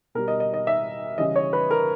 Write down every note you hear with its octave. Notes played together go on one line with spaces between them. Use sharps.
B2 G3 A#4
D#5
D#5
D#5
E5
C#3 E3 G3 D#5
C#5
B4
A#4